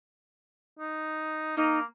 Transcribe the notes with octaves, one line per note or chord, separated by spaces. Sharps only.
D#4
A#3 D#4